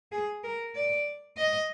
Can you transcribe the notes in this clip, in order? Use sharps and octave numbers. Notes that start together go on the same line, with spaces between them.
G#4
A#4
D5
D#5